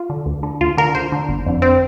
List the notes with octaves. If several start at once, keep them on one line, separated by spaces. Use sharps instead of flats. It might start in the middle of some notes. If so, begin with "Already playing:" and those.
Already playing: F4
D3
D2
D3
D2 F4
D3 A#4
D2 C5
D3
G1
F2 D3
C4